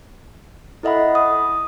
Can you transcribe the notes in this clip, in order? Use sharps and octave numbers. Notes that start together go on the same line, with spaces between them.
E4 A4 D#5 E5 F#5 B5
D#6